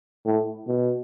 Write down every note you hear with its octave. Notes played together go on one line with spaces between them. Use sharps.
A2
B2